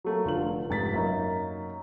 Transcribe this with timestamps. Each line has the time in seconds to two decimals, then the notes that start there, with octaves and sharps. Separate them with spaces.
0.04 F#3 A3 A#3
0.25 F1 D3 F4 F5 F#7
0.69 F1 G#2 A6 B6
0.94 F#2 A#3 D#4